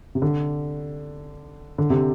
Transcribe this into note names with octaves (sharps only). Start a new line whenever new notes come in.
C3
D3
D3
C3